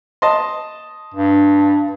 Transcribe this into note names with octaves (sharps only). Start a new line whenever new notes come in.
D#5 A5 C6
G2